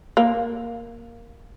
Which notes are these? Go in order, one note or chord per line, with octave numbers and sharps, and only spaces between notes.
A#3